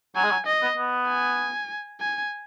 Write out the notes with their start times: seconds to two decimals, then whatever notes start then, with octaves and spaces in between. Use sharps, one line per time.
0.16 F#3 G#5
0.24 G#3
0.31 F#3
0.46 D#5
0.62 B3
0.77 B3
1.08 G#5
2.00 G#5